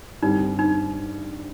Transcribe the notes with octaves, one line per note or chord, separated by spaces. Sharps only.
G2 D3 G3 C4 D#4 G4
D#4